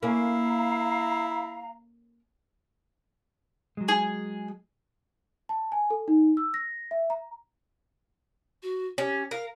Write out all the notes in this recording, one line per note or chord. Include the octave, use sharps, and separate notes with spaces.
A#3 C#4 E4 F5 A#5
F#3 G#3
G#4
A5
G#5
A4
D#4
E6
A#6
E5
A#5
F#4
C#4 G4
A#4 F5